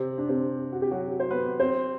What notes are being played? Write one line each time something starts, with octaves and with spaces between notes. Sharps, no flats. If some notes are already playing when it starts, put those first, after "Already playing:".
Already playing: C3 C4
D4
C3 C4
F#4
G4
F#3 F#4
C5
B3 B4
C4 C5